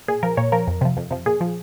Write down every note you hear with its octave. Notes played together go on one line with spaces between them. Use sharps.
A#2 G#4
F3 A#4
A#2 C#5
F3 A#4
F2
C3 F3
F2
C3 F3
A#2 G#4
F3